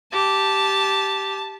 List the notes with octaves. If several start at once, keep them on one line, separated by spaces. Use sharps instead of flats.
G4 A5